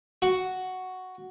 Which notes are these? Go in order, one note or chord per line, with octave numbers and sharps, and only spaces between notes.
F#4